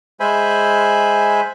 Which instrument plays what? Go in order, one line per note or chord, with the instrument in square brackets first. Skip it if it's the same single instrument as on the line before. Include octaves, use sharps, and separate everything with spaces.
[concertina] G#3 C5 E5 G#5 B5